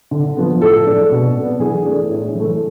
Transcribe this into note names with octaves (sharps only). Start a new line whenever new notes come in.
D3
F3 B3
A2 A4
G#3 D4
B2
B3 D4
E3 G#4
A3 D4
A2
E3 A3